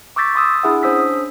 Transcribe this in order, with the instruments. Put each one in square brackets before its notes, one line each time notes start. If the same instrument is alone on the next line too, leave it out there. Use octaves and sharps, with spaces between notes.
[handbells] C#6 D6 E6 G6 A6 B6
C6 D#6 E6
D4 E4 G#4 E5 F#5
C#4 D4 C5 D#6 E6 B6